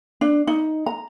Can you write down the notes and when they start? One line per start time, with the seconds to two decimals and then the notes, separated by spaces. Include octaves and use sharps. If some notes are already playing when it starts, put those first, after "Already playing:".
0.21 D4
0.47 D#4
0.86 A#5